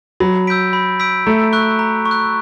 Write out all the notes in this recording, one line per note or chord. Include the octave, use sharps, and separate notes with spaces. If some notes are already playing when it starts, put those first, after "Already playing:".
F#3 B5
E6 G6 B6 D7
B5
E6 G6 B6 D7
A3 A#5
C#6 F#6
A#5
C#6
F#6